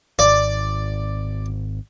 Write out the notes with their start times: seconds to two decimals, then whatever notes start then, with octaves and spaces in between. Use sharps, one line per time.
0.19 G#1 D5